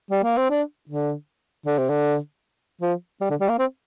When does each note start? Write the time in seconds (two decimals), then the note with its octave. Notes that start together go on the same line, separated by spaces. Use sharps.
0.11 G3
0.23 A#3
0.37 C4
0.50 D4
0.89 D3
1.66 D3
1.78 C3
1.89 D3
2.81 F3
3.21 G3
3.30 D3
3.41 G3
3.49 A#3
3.59 C4